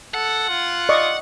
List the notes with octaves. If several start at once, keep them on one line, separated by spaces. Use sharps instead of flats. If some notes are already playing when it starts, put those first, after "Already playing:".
A4 F#5
F4
D5 D#5 C#6